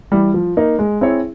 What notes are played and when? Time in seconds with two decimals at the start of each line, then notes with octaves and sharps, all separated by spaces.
0.12 E3 G3
0.34 F3
0.57 A#3 D#4
0.79 G#3
1.01 C4 E4 G#4 C#5